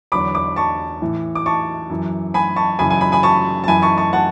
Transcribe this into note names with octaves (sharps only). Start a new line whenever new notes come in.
E2 D3 F#3 B5 D6
B5 D6
A5 C#6
A2 E3
D6
A5 C#6
F#2 E3
G#5 B5
A5 C#6
F#2 C#3 E3 G#5 B5
G#5 B5
G#5 B5
G#5 B5
A5 C#6
A5
F#2 E3 G#5 B5
A5 C#6
A5 C#6
F#5 A5